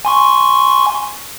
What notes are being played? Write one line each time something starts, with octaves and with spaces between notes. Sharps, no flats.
G#5 C6 C#6